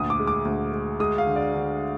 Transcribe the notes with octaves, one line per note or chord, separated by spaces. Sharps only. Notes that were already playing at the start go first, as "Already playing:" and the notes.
Already playing: D2 A#2 D#6
D6
G#3
D6
D2
G#3
G#3 D#6
F5
D3
D5
D3